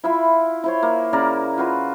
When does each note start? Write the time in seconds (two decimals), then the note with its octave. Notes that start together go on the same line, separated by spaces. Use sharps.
0.04 E4 F4 E5 B5
0.64 E4 C5 C#5
0.82 A#3
1.13 C#3 A#3 A#4 D5
1.58 F4 F#4 B4